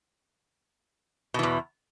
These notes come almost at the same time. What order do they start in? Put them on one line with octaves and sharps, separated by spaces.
B2 E3 E2